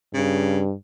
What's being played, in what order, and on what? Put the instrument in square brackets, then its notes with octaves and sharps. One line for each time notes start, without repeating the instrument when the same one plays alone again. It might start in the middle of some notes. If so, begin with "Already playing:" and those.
[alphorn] G2 [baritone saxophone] C#3